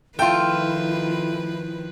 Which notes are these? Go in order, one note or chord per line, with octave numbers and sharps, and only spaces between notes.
D#3 F3 A3 E4 F4 B4 G5